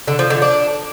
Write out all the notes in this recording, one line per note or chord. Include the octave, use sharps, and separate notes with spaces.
D3
F3
D3
D4